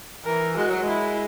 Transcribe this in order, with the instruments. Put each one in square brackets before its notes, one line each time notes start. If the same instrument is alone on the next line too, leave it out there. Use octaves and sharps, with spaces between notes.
[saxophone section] E3 [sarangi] A#4
[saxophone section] G#3 [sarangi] F#4
[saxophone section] F#3
G#3
[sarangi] E4